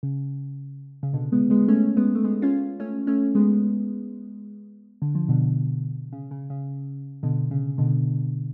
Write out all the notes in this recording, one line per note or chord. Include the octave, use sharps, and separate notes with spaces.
C#3
C#3
B2 D3
G#3 B3
G#3 B3
A3 C#4
G#3 B3
A3
G#3 B3
C#4 F4
A3 C#4
A3 C#4
G#3 B3
D3
F3
B2 D3
C#3
C#3
C#3
B2 D3
C#3
B2 D3